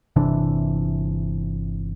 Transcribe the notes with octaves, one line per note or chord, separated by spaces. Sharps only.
G1 C3 E3 D4